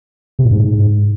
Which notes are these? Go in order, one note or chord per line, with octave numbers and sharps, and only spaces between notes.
C3
A2
G#2